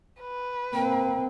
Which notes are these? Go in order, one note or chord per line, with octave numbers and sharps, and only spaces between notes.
B4
A#3 C4 G5